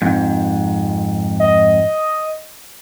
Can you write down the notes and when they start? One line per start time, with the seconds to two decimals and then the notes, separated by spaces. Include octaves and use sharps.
0.02 F2 G#2
1.40 D#5